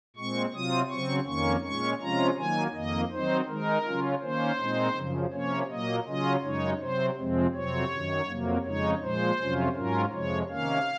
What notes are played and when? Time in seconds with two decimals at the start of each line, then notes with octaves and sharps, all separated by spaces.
0.16 A#2 G#3 C4 C#6
0.53 C3 F#3 C4 F4 D#6
0.90 C#3 F#3 C4 C#6
1.26 F2 D#3 A#3 C#4 C#6
1.64 A#2 G#3 C#4 C#6
2.01 C3 F3 G#3 C#4 F4 A#5
2.37 D#3 F#3 A#3 G#5
2.74 F2 D#3 A#3 D#5
3.11 D#3 F#3 C4 D#4 C5
3.48 D#3 G#3 D#4 A#4
3.85 C#3 F#3 C#4 F4
4.21 D#3 A#3 C#4 C5
4.59 A#2 G#3 C4 D#4
4.96 F#2 C#3 F3
5.33 C3 F3 A#3 C#4 C#5
5.70 A#2 F#3 A#3 D#5
6.07 C#3 F#3 C#4 F4 D#5
6.43 F#2 C#3 G#3 D#4 C#5
6.80 C3 F#3 C4 C5
7.17 F2 C3 F3 G#3 C4
7.54 F2 C3 F#3 C4 C#5
7.91 F#2 D#3 F#3
8.28 F2 C3 F#3 A#3
8.64 F2 C#3 G#3 D#4 C#5
9.02 A#2 F3 G#3 C5
9.39 F2 C3 F#3 C#4 F4
9.75 G#2 F#3 C#4 F4 A#4
10.13 F2 C3 F3 G#3 C#5
10.49 C3 D#3 A#3 C#4 F5